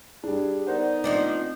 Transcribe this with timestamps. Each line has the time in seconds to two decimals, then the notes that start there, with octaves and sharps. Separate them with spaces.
0.24 G3 D4 G#4
0.67 B3 D#4 A#4 C5 D5 F#5
1.04 F3 C4 D4 D#5